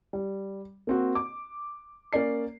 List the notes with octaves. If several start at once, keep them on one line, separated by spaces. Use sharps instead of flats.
G3
A#3 C4 F#4
D6
A#3 C#4 D5 C7